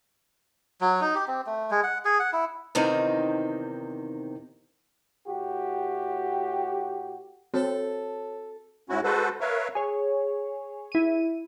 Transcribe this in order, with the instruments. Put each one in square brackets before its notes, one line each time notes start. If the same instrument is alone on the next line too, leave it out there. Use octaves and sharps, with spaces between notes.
[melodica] F#3
D#4
G4
C4
A3
G#3
F#5
G#4
F#5
E4
[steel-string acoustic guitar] E2 C3 D#3 C4 D#4
[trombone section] A2 F#4 G4
[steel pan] C4 [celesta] F#4 C#5 [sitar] A4
[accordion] G#2 C#4 E4 F#4
G#3 F#4 A4 B4 C5
A#4 B4 C#5 E5 F5
[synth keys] G#4 C#5
E4 D#7